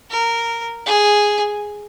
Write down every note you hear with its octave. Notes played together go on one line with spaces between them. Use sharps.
A#4
G#4